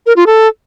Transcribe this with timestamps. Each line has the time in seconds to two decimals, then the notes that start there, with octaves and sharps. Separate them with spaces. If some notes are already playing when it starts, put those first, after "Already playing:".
0.06 A#4
0.16 F4
0.26 A4